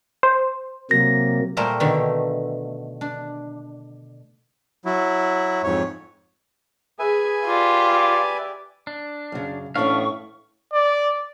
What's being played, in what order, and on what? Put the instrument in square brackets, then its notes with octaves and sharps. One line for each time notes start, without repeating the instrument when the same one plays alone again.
[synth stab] C5
[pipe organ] C3 F#3 A#3 [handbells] A#6
[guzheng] A#2 G3 A3 A#4 C5 A#5
B2 D3 D#3 A3
D4
[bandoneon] F#3 E4
F2 G#2 C#5
[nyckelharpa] G#4 [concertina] B4 E5 G#5
[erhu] F4 [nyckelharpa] G4 D5
[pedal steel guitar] D4
[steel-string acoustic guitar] F#2 C#3
[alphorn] A2 [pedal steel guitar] E3 B3 F5 [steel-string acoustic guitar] C#4 D4 [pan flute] C#6
[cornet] D5